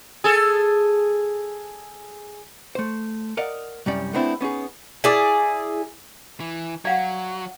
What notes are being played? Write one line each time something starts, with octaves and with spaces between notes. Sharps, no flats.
G#4 A4
A3 C5
A#4 D5 D#5 F5 F#5
C2 F#2 G3 C#4 D5
A3 B3 C4 D4 E4
B3 C#4 D#4 G#4
E4 G#4 D5
E3
F#3 D5 F5 F#5